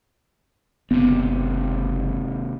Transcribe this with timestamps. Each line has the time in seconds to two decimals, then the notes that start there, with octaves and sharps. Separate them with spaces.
0.91 F#1 D#2 C3 B3